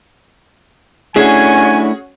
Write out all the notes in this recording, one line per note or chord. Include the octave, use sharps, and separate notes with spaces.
A3 C#4 D4 E4 F#4 G#4 G#5